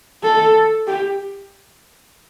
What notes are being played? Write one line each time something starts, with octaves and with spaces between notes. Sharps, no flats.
A4
G4